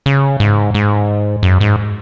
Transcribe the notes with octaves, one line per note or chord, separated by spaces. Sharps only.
C#3
G#2
G#2
F#2
G#2